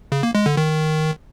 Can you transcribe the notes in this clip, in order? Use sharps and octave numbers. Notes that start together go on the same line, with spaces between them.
C#3
A#3
G#3
D3
D#3